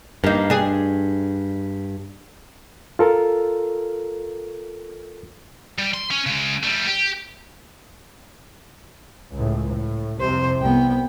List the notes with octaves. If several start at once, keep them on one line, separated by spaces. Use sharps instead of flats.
G2 A#3 D#4
D4 G#4
F4 A4 A#4
G3
C6
C#4
C#3 G#3
G3 A3
G4
C#2 A2
A2
C2 F2 C3 C5
C2 B3 G5